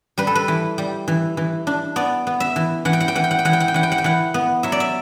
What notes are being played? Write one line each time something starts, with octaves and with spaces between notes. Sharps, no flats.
G3 B4
A4
B4
E3
G3
E3
E3
D4
B3 D5
B3
E5
E3
E3 F#5
G5
F#5
G5
E3 F#5
G5
F#5
G5
E3 F#5
G5
F#5
G5
E3 F#5
G5
F#5
G5
E3 F#5
B3
F#3 E5
D5
E5